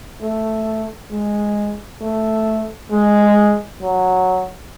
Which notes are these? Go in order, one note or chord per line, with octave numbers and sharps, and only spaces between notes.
A3
G#3
A3
G#3
F#3